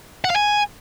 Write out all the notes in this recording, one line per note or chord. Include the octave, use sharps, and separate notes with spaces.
F#5
F5
G#5